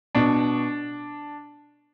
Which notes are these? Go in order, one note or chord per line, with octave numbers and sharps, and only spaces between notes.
B2 D4